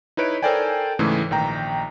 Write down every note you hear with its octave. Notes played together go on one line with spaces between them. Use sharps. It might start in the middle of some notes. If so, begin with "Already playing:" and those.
D#4 E4 B4 C#5 D7
A4 A#4 C5 D5 G5 G#5
G#2 C#3 E3 A3
A#1 D#3 G5 A#5